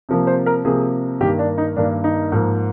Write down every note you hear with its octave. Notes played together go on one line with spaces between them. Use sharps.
C3 F3 A#3
C5
A#4
C3 F3 A#3 G#4
G2 D#3 A#3 G4
D4
D#4
G2 D#3 A#3 D4
D#4
G#2 F3 A#3